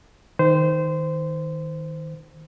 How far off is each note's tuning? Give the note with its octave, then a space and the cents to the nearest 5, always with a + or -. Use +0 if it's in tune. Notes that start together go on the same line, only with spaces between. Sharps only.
D#3 +15 C5 -20